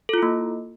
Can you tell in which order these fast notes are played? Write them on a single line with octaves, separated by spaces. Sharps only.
A4 F4 E4 A#3